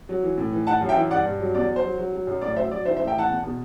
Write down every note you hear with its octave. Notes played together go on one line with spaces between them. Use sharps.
F#3
E3
A2
E3
E3 F#5 A5
F#2
E5 G5
E3
G2 D5 F#5
G2
F#3
E2 D5
F#3
C5
F#3
F#3
F#3
F#2
A2 D5
F#3 C5 E5
F#3 D5
E3 C5 E5
C5 E5
A2
E5 G5
E3 F#5 A5
E2
B2